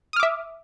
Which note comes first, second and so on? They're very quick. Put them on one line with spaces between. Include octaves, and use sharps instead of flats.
D#6 F6 D6 E5